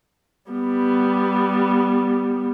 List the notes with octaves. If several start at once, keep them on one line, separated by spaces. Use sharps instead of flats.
G3 B3